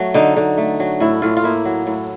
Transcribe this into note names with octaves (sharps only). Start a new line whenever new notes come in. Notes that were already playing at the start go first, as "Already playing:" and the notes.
Already playing: F#3 A3
D3 D#4
D3
A3
F#3
A2 E4
A2 F4
F4
A#3 E4
F#3
A2